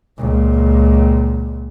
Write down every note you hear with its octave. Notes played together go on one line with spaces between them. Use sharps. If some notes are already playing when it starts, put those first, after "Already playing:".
C#2 A#2